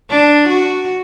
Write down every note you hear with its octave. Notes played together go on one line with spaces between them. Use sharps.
D4
F#4